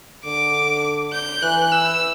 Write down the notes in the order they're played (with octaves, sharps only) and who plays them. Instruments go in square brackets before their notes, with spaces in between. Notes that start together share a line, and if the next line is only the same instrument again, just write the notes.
[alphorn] D3 [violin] D6
[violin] G6
[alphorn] E3 [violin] F#6
[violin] E6